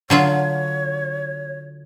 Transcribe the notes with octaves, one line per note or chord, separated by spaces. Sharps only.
D3 F#3 F4 C#5